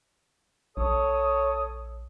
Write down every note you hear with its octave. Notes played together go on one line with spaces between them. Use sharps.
A#1 A4 C#5 D#6